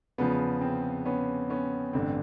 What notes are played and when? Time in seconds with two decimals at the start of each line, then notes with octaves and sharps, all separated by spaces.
0.18 E2 C#3 F3 B3
0.61 C4
1.05 B3 C#4
1.50 B3 C#4
1.93 A1 G2 D3 C4